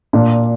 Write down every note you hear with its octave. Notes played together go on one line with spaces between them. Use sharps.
A#2 D4